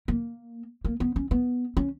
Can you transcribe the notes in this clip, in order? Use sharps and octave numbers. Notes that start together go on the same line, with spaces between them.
A#3
A#3
B3
C#4
B3
C#4